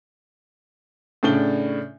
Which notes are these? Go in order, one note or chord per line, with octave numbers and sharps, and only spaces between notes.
A2 C#3 D4 D5 G7